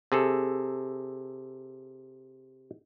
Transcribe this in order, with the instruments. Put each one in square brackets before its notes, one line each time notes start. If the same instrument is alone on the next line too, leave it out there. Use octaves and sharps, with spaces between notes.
[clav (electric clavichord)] C3 G#4 A4